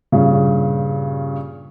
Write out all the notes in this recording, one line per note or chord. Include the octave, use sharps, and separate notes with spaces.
G2 A#2 C#3